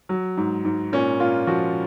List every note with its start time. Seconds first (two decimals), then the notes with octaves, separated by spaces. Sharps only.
0.09 F#3
0.37 G#2
0.64 G#2
0.92 A#2 C#4
1.19 A#2 F4
1.47 F3 F#4